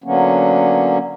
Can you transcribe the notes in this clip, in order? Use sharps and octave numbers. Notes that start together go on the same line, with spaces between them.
D3 F#3 A#3 B3 C#4